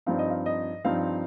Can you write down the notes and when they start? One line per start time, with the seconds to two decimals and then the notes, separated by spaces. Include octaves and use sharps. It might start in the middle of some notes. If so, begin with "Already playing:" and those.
0.06 G2 F3 C4 D#4 F5
0.19 D#5
0.30 F5
0.46 D#5
0.84 G2 F3 C4 D#4 F5